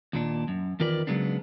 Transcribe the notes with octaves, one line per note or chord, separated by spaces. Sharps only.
D#2 A#2 D4
F#2
E2 D#3 F4 A#4 B4 D5
C#3 F#3 G#3 B3 D4